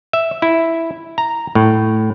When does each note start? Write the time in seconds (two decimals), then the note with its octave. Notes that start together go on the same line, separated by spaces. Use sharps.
0.13 E5
0.42 E4
1.18 A#5
1.55 A2